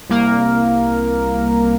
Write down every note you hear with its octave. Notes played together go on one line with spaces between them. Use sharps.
C2 A#3 A#4